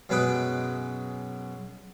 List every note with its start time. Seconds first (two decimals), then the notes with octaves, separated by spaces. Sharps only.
0.09 F#2 B2 G#3 B4 G5 D#6